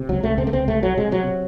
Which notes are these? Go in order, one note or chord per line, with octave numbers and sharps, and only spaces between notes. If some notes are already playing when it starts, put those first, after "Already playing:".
Already playing: C3
C#2 F#3
C#2 A3
C3 C4
A3
C#2 C4
C3 A3
C2 F#3
C3 G#3
C3 F#3
C3